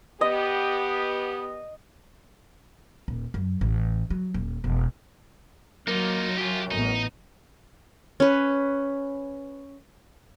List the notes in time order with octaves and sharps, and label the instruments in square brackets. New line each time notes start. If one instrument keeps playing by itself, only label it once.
[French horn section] B3 G4 [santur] D#5
[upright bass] D#1
F#2
A1
F#3
D#1
E1
[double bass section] F#3 [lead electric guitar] A#3 [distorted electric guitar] D#4 F4
[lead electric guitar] F#2 [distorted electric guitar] F4 G4
[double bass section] A1 A2 B3 [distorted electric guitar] D#4
[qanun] C#4 B4